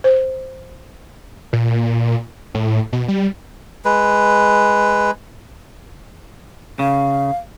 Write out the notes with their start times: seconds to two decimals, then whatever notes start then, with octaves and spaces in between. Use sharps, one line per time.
0.04 C5
1.53 A#2
2.54 A2
2.93 B2
3.08 G3
3.85 G#3 B4
6.79 C#3 F5